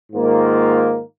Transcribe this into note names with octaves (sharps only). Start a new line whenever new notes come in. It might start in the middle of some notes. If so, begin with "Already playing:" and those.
G#2 D#3 A#3 F4